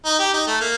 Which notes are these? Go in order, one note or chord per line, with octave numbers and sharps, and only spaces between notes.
D#4
G4
D#4
A3
A#3